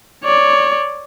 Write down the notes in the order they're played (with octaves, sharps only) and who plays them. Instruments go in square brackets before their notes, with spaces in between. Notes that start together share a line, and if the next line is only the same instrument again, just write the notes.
[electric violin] C#5 D5